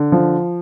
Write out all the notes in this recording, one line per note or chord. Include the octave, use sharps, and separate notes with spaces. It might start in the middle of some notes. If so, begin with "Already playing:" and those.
Already playing: D3
F3